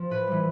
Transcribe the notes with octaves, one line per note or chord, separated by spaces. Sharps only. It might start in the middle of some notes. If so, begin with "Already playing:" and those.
Already playing: F3
A2 B4
E3 G3